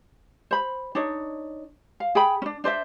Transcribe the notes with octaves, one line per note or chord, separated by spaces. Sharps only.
C5 B5
D4 D#4 C#5
F5
G#4 G5 B5
C#4 D4
D4 C5 D#5 E5